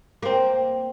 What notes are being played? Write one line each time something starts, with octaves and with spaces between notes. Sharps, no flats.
A#3 C4